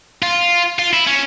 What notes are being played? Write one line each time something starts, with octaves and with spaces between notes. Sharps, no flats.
F4
F4
E4
C#4